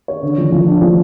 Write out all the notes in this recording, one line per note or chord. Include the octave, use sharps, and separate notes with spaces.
C#5
D3
F3
F3
D4
F3